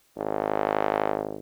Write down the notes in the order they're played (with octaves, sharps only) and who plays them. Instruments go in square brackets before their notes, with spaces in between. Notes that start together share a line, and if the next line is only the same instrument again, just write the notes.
[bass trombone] G#1